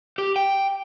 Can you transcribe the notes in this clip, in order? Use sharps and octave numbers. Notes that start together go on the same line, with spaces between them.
G4
G5